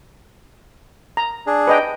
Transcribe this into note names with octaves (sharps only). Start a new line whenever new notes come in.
A#5
D4 G#4
B4 D#5 G5